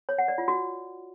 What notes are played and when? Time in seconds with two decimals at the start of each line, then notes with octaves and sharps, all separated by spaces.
0.09 C#5
0.18 F#5
0.28 D5
0.38 F4
0.48 F#4